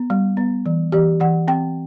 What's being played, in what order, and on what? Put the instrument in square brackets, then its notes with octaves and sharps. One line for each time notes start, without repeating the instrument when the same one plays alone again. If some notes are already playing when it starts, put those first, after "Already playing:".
Already playing: [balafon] B3
G3
B3
E3
E3 G4
E3 F#5
C4 G5